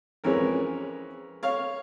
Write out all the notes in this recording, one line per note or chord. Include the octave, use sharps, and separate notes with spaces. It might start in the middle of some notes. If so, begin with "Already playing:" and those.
F2 E3 G#3 C#4 A#4 C#5
C#5 F5